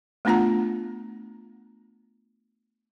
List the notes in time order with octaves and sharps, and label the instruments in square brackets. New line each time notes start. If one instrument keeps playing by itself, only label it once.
[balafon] A3 B3 D4 F4 F#5 A#5